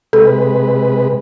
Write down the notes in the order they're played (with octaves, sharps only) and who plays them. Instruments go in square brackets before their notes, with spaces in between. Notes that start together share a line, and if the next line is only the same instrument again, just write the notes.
[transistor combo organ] C3 G#3 B4 [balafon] A4